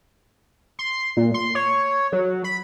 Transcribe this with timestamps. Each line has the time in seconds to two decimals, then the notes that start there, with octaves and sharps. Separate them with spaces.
0.79 C6
1.17 A#2
1.34 C6
1.55 C#5
2.12 F#3
2.44 B5